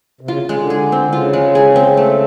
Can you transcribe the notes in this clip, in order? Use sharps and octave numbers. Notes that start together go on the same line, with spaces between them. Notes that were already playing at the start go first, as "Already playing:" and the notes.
C3
C#3 F4
C#3
G#3
D3
G#4
C4
C#3 F4
G#3
G#4
C4
A3